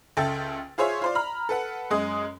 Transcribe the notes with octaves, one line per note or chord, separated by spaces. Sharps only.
C#2 A4 E5 G5 A6
F4 G#4 C5 C#5 E5
F4 C5 D5
A#5 B5 F6
A4 B4 F#5
F#2 G#3 D#6